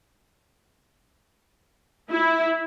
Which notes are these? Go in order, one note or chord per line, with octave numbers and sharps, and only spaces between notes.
E4